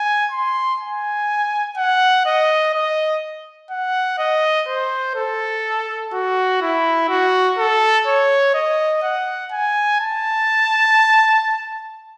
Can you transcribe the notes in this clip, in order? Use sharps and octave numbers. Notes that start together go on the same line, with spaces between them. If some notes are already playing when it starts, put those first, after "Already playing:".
Already playing: G#5
C6
G#5
F#5
D#5
D#5
F#5
D#5
C5
A4
F#4
E4
F#4
A4
C#5
D#5
F#5
G#5
A5